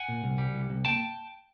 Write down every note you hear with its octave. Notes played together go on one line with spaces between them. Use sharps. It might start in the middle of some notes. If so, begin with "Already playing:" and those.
Already playing: F#5 G#5
A#2
C2
G3
C2
C2
A#3 G5 A5